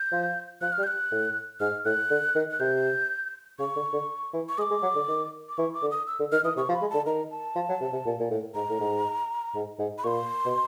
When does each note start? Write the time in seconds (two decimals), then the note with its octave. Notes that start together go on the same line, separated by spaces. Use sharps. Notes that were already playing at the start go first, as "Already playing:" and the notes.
Already playing: G6
0.12 F3
0.62 F3 F#6
0.73 F6
0.78 G3
0.83 G6
0.87 F#6
1.12 A2
1.61 G#2 F6
1.85 A2 F#6
2.11 D3
2.35 D#3
2.51 F#6
2.60 C3 G6
3.59 C#3 C#6
3.76 D3
3.93 D3
4.33 E3
4.49 C#6
4.58 G#3 D#6
4.62 D6
4.71 G#3
4.83 F#3
4.96 D3
5.08 D#3
5.49 D6
5.58 E3 C#6
5.74 D6
5.82 D3
5.91 D#6
6.07 E6
6.20 D3
6.32 D#3 F6
6.44 E3 D#6
6.57 C3 C#6
6.69 F3
6.74 B5
6.81 G#3
6.90 D3 A5
7.06 D#3 A#5
7.31 A5
7.56 F3
7.69 F#3
7.81 C3
7.93 C3
8.06 A#2
8.20 A#2
8.31 A2
8.55 G#2 A#5
8.69 A2
8.80 G#2
9.55 G#2
9.79 G#2
9.98 B5
10.04 A#2 C6 C#6
10.45 B2